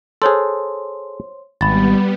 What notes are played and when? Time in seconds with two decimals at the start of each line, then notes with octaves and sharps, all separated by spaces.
0.22 G#4 A4 C5 C#5 C6
1.61 G#1 G3 B3 B5 A6